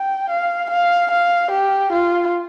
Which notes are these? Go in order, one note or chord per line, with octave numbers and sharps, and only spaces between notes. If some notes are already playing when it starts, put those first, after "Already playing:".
Already playing: G5
F5
F5
F5
G4
F4